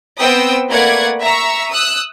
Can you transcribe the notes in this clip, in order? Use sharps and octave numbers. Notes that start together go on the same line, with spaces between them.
B3 C4 G5 D#6 E6
A3 A#3 B4 D5 F#5 G#6
E5 A#5 C#6 E6
D#6 E6 F#6